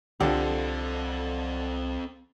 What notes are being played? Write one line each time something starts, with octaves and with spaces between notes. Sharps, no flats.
C2 D3 F3 C4 G4 A4